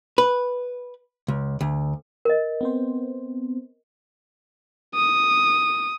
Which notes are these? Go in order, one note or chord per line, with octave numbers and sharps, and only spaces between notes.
B4
C#2
D2
A#4 D#5
B3 C4 C5
D#6